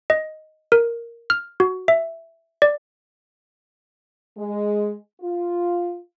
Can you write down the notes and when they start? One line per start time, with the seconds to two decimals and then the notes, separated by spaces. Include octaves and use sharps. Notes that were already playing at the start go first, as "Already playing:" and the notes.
0.10 D#5
0.72 A#4
1.30 F6
1.60 F#4
1.88 E5
2.62 D5
4.37 G#3
5.21 F4